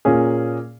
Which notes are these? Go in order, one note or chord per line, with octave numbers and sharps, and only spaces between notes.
A#2 A#3 C#4 G#4